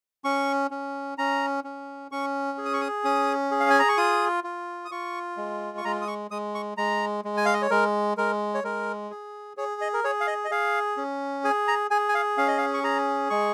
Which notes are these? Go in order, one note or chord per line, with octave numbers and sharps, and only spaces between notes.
C#4 C#6
C#4
C#4 A#5
C#4
C#4 C#6
G#4
D#6
C#6
D#6
C#4 D#6
G#4
F5
G#5
A#5
C#6
F4 D#6
F4
D#6
F4 C#6
G#3
C#6
G#3 A#5
D#6
C#6
G#3 D#6
C#6
G#3 A#5
G#3
G#5
F5
D#5
C#5
G#3 A#4
G#3 A#4
C#5
G#3 A#4
G#4
G#4 C#5
D#5
A#4
G#4 C#5
F5
D#5
D#5
G#4 F5
C#4
G#4 G#5
A#5
G#4 G#5
G#5
F5
C#4 F5
D#5
F5
C#6
G#4 A#5
G#3 C#6